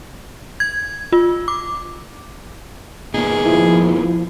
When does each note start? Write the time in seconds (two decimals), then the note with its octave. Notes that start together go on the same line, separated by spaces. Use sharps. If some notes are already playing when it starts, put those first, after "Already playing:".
0.60 G#6
1.13 F4
1.48 D6
3.14 A#2 A#3 B3 D#4 G#4
3.46 F3 E4